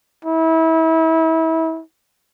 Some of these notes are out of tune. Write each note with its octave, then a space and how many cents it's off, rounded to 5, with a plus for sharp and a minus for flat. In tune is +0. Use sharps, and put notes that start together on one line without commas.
E4 -30